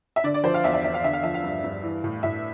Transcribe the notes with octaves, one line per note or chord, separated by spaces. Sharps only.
E5
D3 D5
D5
F3 C5
F5
E2 E5
E5
E2 E5
F5
D3 E5
F5
F3 E5
F5
G2
G2
E3
A2
A2 E5